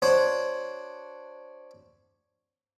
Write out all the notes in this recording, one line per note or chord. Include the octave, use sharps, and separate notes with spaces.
D4 F#4 C5 C#5